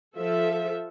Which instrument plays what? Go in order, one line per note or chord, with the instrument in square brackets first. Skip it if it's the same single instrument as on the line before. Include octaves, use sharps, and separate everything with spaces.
[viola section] F3 A4 E5